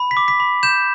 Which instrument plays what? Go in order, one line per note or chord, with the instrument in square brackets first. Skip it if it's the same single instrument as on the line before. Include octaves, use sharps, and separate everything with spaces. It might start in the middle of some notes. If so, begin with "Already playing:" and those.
Already playing: [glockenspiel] B5
B6
D6
B6
B5
G6 E7